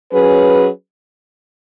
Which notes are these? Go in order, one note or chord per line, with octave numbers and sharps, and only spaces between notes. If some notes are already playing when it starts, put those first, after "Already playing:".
F#3 C#4 G#4 B4